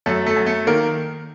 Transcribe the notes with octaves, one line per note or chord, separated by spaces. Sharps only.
F#2 A3 A4
A3 A4
F#2
A3 A4
D#3 A#3 A#4